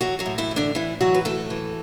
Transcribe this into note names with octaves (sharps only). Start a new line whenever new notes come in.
E3 F#3 F#4
F#3 F#4
A2
E3 E4
E3
D3 D4
A2 E3 E4
E3 F#3 F#4
B4
A2 A3 A4
E3